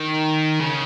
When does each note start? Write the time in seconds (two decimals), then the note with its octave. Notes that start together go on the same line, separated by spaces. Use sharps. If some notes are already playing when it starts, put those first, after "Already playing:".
Already playing: D#3
0.60 C#3